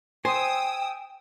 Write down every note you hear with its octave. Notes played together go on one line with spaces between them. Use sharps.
C5 G5 G#5 D#6 E6